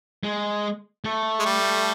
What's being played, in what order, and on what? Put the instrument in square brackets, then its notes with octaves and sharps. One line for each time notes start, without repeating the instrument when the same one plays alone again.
[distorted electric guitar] G#3
A3
[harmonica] G#3
G3